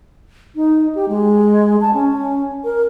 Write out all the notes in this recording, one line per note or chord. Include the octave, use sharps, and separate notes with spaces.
D#4
G4
G#3
A5
C#4
A#4